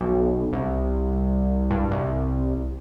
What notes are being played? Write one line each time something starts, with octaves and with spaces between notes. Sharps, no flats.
B1
C2
G2
C2